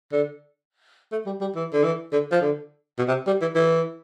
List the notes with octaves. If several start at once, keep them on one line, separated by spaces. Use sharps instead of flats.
D3
A3
G3
G3
E3
D3
E3
D3
F3
D3
B2
C3
G3
E3
E3